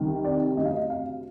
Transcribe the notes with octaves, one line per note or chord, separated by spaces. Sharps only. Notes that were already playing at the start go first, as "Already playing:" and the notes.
Already playing: C2 C3 D#3 G3
D5
D2 C3 G3 D#5
F5
D#5
F5